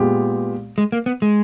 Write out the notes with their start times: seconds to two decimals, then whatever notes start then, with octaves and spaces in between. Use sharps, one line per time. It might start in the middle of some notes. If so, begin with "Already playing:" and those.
Already playing: A#2 G#3 B3 G4
0.78 G#3
0.92 A#3
1.06 B3
1.22 G#3